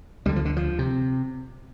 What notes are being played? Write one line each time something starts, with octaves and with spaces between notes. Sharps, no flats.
D2 D3 G3
F3
D3
F3
C3